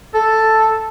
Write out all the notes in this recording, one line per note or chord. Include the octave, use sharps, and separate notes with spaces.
A4